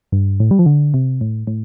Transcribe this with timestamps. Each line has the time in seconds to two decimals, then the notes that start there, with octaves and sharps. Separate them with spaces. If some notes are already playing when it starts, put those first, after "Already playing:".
0.12 G2
0.40 A2
0.51 G3
0.59 F3
0.66 D3
0.94 C3
1.21 A2
1.47 A2